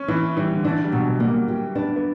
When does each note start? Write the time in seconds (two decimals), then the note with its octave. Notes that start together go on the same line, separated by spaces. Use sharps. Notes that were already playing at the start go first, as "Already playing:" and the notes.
Already playing: C#4
0.08 E3 E4
0.37 E3 G3
0.55 D3
0.64 E3 D4
0.84 G3
0.92 B2 F#3
1.20 G3 A#3
1.48 G4
1.75 B3 D4
1.96 B3